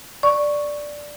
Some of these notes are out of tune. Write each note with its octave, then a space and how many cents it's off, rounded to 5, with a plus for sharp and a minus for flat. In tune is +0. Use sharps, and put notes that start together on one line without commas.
D5 +0 C#6 +0